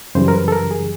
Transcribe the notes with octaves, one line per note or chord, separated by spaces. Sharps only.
F#2 C#3 E3 G3 C5
A#4
B4
A4
A#4
G#4